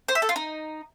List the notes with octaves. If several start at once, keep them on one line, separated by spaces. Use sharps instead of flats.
C5
E5
A4
F4
D#4